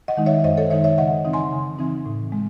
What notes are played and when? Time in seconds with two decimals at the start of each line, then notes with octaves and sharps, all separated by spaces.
0.08 D#5 F#5
0.17 D#3 G#3 D#4
0.26 C#5 E5
0.44 F#2 C5 D#5
0.57 A4 C#5
0.70 D#3 G#3 D#4 C#5 E5
0.84 C#5 E5
0.98 C#3 D#5 F#5
1.25 E3 C4 D#4
1.33 G#5 C6
1.52 C#3
1.79 E3 C4 D#4
2.06 A2
2.32 G#3